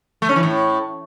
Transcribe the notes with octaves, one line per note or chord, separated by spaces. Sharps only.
A3
C#4
E3
A2